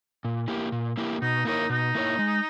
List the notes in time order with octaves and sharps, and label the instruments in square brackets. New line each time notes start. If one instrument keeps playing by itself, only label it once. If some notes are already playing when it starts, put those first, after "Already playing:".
[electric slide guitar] A#2
A#3 E4 G4
A#2
A#3 E4 G4
[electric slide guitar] B2 [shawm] D#4
[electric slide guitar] A#3 E4 A#4 C#5 [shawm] D#4
[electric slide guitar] B2 [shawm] D#4
[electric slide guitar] A#3 E4 A#4 C#5
G#3